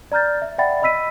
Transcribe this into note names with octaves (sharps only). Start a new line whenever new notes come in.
D5 A#5 F6 G6 A6
E5
D5 E5 F#5 G5 B5 A6
D#5 B5 E6 B6 D#7